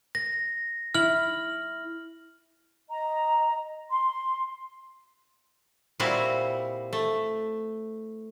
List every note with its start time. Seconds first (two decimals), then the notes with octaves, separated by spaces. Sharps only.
0.15 A#6
0.95 E4 F6 F#7
2.88 D#5 A#5
3.90 C6
6.00 A#2 G3 C4 E4 F#4 F5
6.93 A3